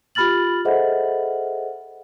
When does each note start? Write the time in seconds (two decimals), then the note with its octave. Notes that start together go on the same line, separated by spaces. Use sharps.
0.15 F4 G4 B5 F6 A6 F#7
0.65 G#4 A4 C5 D#5 E5 F#5